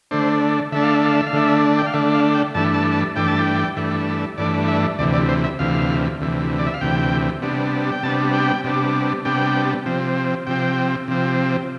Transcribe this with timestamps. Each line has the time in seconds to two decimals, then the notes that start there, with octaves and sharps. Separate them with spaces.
0.11 D3 A3 D4 C5
0.72 D3 A3 D4 E5
0.83 F5
0.94 E5
1.04 F5
1.15 E5
1.27 F5
1.33 D3 A3 D4 E5
1.79 G5
1.87 F5
1.93 D3 A3 D4 E5
2.14 F5
2.35 G5
2.55 G2 E3 A3 D4 A5
2.74 A5
2.92 A5
3.16 G2 E3 A3 D4 G5
3.28 A5
3.39 G5
3.76 G2 E3 A3 D4
4.38 G2 E3 A3 D4 D5
4.68 E5
4.99 D2 C3 E3 D5
5.14 D5
5.29 C5
5.44 E5
5.59 D2 C3 E3 F5
6.21 D2 C3 E3
6.59 D5
6.67 E5
6.74 F5
6.81 D2 C3 E3 G5
7.42 C3 G3 B3 D4
7.92 G5
8.03 C3 G3 B3 D4 A5
8.33 G5
8.64 C3 G3 B3 D4
9.25 C3 G3 B3 D4 G5
9.86 C3 F3 C4
10.47 C3 F3 C4 G5
11.08 C3 F3 C4